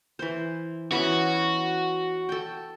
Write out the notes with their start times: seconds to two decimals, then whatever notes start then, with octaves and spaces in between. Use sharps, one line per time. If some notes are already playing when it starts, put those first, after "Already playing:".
0.19 E3 C5
0.92 E3 B3 C#4 F#4
2.29 A4 G5